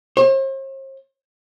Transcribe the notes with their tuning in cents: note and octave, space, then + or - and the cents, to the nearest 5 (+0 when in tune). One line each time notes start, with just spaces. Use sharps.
C5 +45